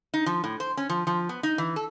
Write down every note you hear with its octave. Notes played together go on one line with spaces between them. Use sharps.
D#4
F3
A2
C5
C#4
F3
F3
B3
D#4
E3
A4